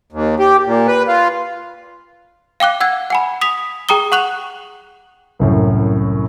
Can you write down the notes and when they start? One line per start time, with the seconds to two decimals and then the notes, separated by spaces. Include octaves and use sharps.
0.12 D#2
0.39 G4
0.66 A#2
0.88 B4
1.07 F4
2.60 F5 G5 D6 F#6
2.81 F#5 E6 G#6
3.10 F#5 G#5 B5
3.41 D#6 B6 F7
3.89 G#4 G5 A#5 D#6 G7
4.12 F#5 C#6 F#6 F7 F#7
5.40 C2 F#2 A2